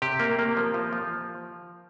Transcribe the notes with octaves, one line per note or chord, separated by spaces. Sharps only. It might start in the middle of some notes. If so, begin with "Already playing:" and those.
C3 G4
A#3
A#3
F3
F3
F3